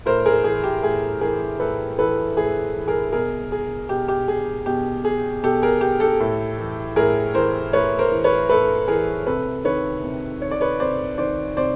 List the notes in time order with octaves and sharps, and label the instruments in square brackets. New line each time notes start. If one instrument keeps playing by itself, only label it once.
[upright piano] A2 A#4 C5
G#4 A#4
E3 G#4
G4
A2 G#4
E3 G#4 A#4
A2 A4 B4
E3 A4 B4
A2 G#4
E3
G#4 A#4
B2 G#4 A#4
G#4
B2 G4
G4
G#4
B2 G4
G#4
B2 G4 A4
G#4 A#4
G4
G4 A4
A2
E3
A2 G#4 A#4
E3 A#4 C5
A2 B4 C#5
A#4 C5
E3
B4 C#5
A2 A4 B4
E3 G#4 A#4
C3 A4 B4
D#3 B4 C#5
C3
D#3 C#5
D5
B4 C#5
C3 C5 D5
D#3 C5 D5
C3 C5 D5